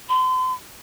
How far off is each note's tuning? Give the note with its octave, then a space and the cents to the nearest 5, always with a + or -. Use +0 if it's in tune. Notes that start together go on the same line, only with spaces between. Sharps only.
C6 -40